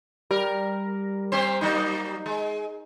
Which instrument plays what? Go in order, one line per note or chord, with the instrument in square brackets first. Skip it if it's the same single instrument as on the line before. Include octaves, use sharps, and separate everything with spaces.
[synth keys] G3 [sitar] A#4
[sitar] A#3 C4 C5
F#3 A#3 D#4
G#3